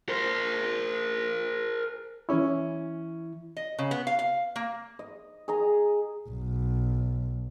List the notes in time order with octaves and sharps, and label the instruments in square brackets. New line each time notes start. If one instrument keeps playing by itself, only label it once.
[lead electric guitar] A#4 C5
[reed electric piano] E3 E4 [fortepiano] C#4 C#6
[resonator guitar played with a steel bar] D#5
C#3
B3
F5
F5
A#3
[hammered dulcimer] D#5
G#4 D#5 A#5
[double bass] B1